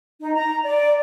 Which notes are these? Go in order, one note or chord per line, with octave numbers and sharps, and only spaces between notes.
D#4
A#5
D5